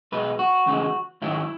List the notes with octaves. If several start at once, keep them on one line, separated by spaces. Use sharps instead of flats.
B1 B2 G#3 B4
F#4
E2 C#3 E3 G#3
G#2 D#3 F#3 E4